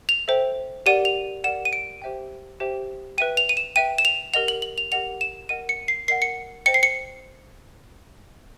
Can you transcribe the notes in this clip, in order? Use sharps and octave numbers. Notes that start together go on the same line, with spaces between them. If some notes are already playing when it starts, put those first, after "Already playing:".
F7
A4 C5 E5 G5
G4 A#4 D5 F#5 D#7
F7
G4 A#4 D5 F#5 E7
D#7
D7
G4 C5 E5 G5
G4 C5 E5 G5
B4 E5 G5 D#7
F7
D#7
E7
B4 E5 G5 D#7
E7
F7
G4 A#4 D#5 F#5 F7
F#7
F#7
F7
G4 A#4 D#5 F#5 F7
E7
A#4 D#5 F#5 D#7
C#7
C7
A#4 D#5 F#5 C7
C#7
C5 D#5 G5 C#7
C7
C#7